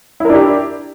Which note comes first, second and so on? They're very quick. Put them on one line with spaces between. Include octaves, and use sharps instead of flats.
E4 A#4 D4 G4